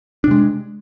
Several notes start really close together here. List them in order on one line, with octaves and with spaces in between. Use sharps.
D4 C3 G#3